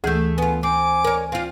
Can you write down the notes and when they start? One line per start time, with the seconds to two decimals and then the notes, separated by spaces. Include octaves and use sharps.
0.04 D2 E3 A3 G#4 G6
0.38 B3 F4 G#5
0.63 C4 G#5 D6
1.04 A#4 C#5
1.32 C4 F4 F5